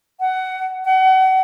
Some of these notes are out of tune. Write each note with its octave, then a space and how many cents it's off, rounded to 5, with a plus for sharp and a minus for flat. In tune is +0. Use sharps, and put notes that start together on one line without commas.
F#5 +20
F#5 +35